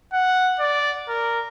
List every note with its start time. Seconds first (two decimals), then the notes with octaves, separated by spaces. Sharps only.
0.13 F#5
0.60 D5
1.09 A#4